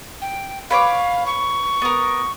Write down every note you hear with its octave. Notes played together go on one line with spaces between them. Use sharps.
G5
B4 C#5 F5 D6
C#6
B3 A#4